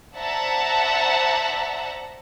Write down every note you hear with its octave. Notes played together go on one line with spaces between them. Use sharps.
C5 D5 E5 F#5 A5 A#5